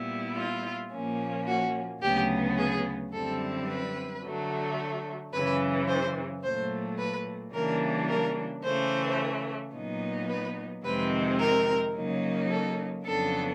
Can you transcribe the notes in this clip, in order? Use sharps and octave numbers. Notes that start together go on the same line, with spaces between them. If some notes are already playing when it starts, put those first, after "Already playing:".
Already playing: A#2 G3 B3 E4
F4
A#2 F3 A#3 C#4
F#4
D2 C#3 F#3 B3 G4
G#4
F#2 D3 G3 C4 E4 A4
B4
D3 F#3 A3
F#2 C#3 E3 B4
C5
A#2 F#3 A3 C5
B4
C#3 E3 G3 A#3 D4 A#4
A#4
C#3 E3 A3 C5
A#2 F#3 B3 D#4
B4
F2 C3 D#3 G#3 C4 B4
A#4
C#3 F#3 A#3 D#4
A4
F2 C#3 F#3 B3 D4 A4